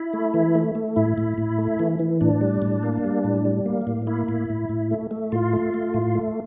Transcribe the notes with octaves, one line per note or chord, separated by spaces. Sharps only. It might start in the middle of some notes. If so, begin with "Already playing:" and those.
Already playing: E4
A3
E3
A3
A3
A2 E4
A2
A2
A3
E3
E3
A2 D4
G3
A2
A#3
G3
A2
G3
A#3
A2
A#3 E4
A2
A2
A2
A3
A3
A2 F4
A3
A3
A2
A3